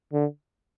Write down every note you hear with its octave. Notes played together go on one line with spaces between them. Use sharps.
D3